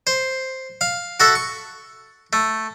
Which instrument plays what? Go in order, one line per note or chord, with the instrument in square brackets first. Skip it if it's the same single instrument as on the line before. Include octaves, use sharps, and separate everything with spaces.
[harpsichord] C5
F5
F#4 A4 E5
C#6
A3